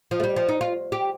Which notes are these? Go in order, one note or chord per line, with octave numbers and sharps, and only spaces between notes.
F3
A3
G3
F3
D#4
F4
G4